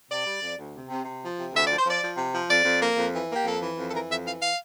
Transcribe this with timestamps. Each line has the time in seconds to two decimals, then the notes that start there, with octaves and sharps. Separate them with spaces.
0.10 C3 D5
0.26 G3
0.42 F2
0.58 D2
0.74 C3
0.89 C3
1.05 C3
1.21 F3
1.38 C3
1.54 D2 E5
1.65 F3 D5
1.77 C5
1.86 F3 D5
2.02 F3
2.17 C3
2.34 F3
2.49 F2 D5
2.65 F2
2.81 A#3
2.97 F2
3.13 E3
3.29 A#3
3.35 G4
3.45 F2 A4
3.61 E3
3.77 F2
3.89 A4
3.93 E3 A#4
4.09 F2 E5
4.25 E3 F5
4.41 F5